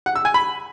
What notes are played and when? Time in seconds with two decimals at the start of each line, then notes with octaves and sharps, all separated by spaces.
0.06 F#5
0.16 E6
0.25 G#5
0.34 B5